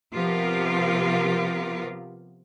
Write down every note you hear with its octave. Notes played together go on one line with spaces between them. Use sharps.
C3 F3 B3 F4 G4 A#4